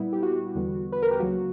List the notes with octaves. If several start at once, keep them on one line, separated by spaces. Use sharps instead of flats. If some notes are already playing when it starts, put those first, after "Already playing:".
Already playing: A#2 G3 B3 E4
G4
F#4
E2 D3 G3 B3
B4
A#4
G4
C#2 C#3 F#3 A#3 F#4